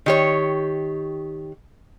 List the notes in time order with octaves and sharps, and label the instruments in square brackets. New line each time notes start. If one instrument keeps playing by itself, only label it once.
[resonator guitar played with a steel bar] D#3 G4 C#5